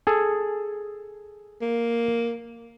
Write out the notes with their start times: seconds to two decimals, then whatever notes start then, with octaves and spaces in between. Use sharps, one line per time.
0.07 G#4 A4
1.61 A#3